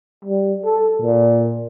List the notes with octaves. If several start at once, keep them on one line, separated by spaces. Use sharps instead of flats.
G3
A4
A#2